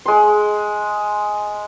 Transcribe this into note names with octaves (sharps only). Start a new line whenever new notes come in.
G#3 C6